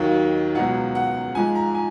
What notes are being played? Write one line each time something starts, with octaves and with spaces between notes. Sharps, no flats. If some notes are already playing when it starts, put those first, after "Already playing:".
Already playing: D#2 D#3 F#3 F5
C#2 B2 F#3 F#5
F#5
G#2 F3 G#5
A#5
G#5